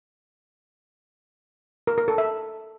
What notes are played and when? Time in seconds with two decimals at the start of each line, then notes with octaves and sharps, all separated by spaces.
1.87 A#4
1.98 A#4
2.08 A4
2.18 E5